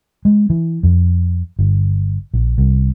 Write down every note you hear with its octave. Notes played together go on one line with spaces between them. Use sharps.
G#3
E3
F2
G1
A#1
C2